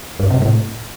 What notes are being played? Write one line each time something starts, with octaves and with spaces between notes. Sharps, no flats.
G2
C3
A2